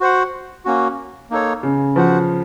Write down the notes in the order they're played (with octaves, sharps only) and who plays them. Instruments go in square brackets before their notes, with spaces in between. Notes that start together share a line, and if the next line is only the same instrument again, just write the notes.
[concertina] F#4 C5 F#5
A#3 C#4 F#4
A#3 D#4 A4 C#5
[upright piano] C#3
[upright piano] F3 [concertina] F#4 C5 F#5